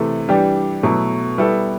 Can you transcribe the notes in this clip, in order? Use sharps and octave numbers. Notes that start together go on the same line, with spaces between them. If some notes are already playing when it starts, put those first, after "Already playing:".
Already playing: C3 E3 A3 E4 A4
E3 G3 D4 G4 D5
B2 F#3 A3 E4
G3 B3 E4 A4